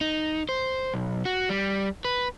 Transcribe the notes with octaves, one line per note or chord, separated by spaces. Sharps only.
D#4
C5
B1
F#4
G3
B4